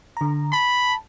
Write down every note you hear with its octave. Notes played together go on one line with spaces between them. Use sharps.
D3 A#5
A5 B5